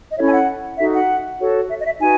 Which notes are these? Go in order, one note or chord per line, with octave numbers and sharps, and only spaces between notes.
D#5
C#4 E4 A4 C#5 E5
G#5
F#5
D#4 F#4 A4 E5
F#5
F#4 A4 C#5
E5
D#5
E5
D#4 F#4 B4 G#5